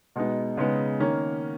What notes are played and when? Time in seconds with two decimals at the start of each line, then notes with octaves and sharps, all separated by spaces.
0.16 B2 G#3 B3 D#4
0.57 C#3 G#3 B3 D#4
1.00 D#3 A#3 C#4